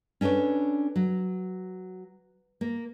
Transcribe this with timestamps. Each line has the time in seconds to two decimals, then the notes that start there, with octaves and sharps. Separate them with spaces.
0.21 C#4 D4 A4 B4 C#5
0.96 F#3
2.61 A#3